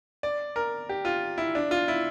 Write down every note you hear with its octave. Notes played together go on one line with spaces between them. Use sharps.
D5
A#4
G4
F4
E4
D4
F4
E4